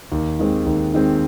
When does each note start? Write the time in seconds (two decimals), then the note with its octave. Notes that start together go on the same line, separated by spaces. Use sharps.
0.12 D#2
0.40 D#3 G#3 C4
0.66 D#2
0.94 D#3 G#3 C4